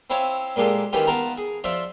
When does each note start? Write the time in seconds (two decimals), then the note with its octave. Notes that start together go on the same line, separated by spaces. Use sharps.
0.10 C4 E4 C#5 F5 G#5 A5
0.56 A#2 G#3 A#3 G4 A4
0.93 D#3 E3 C#4 F4 G4
1.07 B3 F4 A#4 A5 A#5
1.37 G#4
1.64 F3 F4 D5 E5